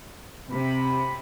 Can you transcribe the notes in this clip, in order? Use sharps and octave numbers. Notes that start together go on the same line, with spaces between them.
C3 B5